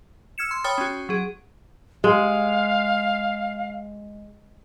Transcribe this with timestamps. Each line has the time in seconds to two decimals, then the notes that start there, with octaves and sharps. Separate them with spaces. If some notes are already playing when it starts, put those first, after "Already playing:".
0.38 E6 F6 G#6 C#7 E7
0.51 C6
0.64 C#5 G5 B5 D#6 F6 A6
0.78 C#4 F#4
1.09 F#3 G#4
2.04 G#3 F5